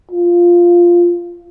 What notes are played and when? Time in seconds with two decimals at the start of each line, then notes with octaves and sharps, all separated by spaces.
0.11 F4